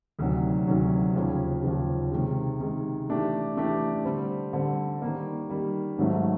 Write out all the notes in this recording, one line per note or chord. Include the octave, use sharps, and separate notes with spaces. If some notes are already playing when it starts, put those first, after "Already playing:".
D2 C3 D#3 F#3
D2 C3 D#3 F#3
D#2 C#3 F3
D#2 C#3 F3
C3 D#3 G#3
C3 D#3 G#3
E3 A3 D4 G4
E3 A3 D4 G4
D3 G3 C4
D3 G3 C4
D#3 G3 A#3
D#3 G3 A#3
G#2 D#3 F#3 A3